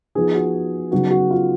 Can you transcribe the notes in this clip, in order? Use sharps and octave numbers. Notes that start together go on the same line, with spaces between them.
F3 B3 D#4 G#4
F#4
C#3 F#3 B3 D#4 F#4
F#4
F4